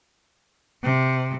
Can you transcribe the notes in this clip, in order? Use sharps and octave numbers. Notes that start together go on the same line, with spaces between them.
C3